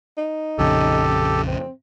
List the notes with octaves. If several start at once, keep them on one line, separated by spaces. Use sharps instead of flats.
D#4
A#1 F2 C#3 G4 A4
C4